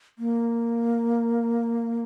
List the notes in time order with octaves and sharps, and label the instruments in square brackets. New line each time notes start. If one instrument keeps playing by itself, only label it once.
[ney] A#3